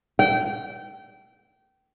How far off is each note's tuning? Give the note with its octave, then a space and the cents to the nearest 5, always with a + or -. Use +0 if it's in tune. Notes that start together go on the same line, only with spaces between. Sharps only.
G5 -25